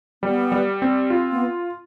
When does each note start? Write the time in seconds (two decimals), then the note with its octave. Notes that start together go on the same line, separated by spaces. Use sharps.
0.23 G3 B3
0.52 G3
0.82 C4
1.10 F4
1.31 B3